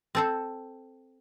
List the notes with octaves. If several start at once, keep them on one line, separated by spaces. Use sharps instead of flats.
C4 A4 C5